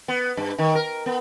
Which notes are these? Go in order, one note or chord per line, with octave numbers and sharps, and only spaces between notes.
B3
G2
D#3
A#4
B3